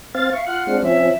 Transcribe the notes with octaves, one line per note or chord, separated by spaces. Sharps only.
C4 F5 A6
E5 F5 C#6
F4 F#5 F6 F#6
G#3 C4 D4
F3 C4 C#4 E5